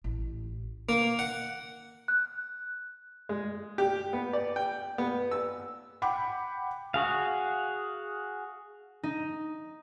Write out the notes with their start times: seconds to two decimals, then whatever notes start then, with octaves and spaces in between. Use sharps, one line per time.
0.04 A1
0.89 A#3
1.19 F#5
2.08 F#6
3.29 G#3
3.78 G4
4.13 B3
4.33 D5
4.56 G5
4.98 B3
5.31 E6
6.02 F#5 G5 B5 D6
6.94 F#4 G#4 F5
9.03 D#4